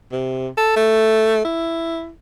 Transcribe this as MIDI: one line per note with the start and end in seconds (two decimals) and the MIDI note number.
0.12 0.48 48
0.57 0.71 69
0.76 1.41 57
1.45 2.11 64